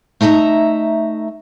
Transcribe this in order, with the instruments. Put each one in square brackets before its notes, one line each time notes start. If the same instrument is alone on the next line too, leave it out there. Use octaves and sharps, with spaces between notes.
[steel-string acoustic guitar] A3 D#4 D#5 E5 A#5